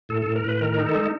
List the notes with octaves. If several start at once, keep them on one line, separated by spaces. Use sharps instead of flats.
A2 A4
A2 A4
A#4
A2 B4
D#3 A#4
D#4
A4
G#3